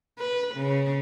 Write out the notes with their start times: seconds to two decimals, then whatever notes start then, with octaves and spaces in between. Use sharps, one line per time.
0.18 B4
0.55 C#3